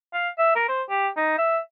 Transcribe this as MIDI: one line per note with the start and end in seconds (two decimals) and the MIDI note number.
0.14 0.29 77
0.38 0.54 76
0.56 0.64 70
0.69 0.82 72
0.89 1.08 67
1.17 1.35 63
1.38 1.59 76